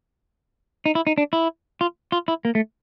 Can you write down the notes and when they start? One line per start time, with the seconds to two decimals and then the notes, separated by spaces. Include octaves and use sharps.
0.86 D#4
0.95 E4
1.07 D#4
1.18 D4
1.33 E4
1.81 F4
2.12 F4
2.28 E4
2.45 A#3
2.55 A3